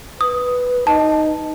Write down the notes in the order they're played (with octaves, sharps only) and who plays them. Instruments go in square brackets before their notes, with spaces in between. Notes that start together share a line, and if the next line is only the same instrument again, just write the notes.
[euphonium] B4 [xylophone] D#6
[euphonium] D#4 [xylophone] A5